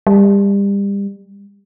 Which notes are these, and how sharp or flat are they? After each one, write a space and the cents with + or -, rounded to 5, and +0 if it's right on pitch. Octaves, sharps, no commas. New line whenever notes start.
G3 +30